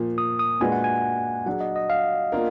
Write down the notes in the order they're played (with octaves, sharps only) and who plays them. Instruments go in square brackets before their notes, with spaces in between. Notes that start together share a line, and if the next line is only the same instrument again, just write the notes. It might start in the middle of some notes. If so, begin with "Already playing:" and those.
Already playing: [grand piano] A#2 F3 A#3
[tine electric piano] D#6
D#6
[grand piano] A#2 G#3 D4 F#4 B4 [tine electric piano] G#5
[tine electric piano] F#5
G#5
[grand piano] F#3 D4 G#4 [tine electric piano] F#5
[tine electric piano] D#5
D#5
F5
[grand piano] A#3 D4 F4 A#4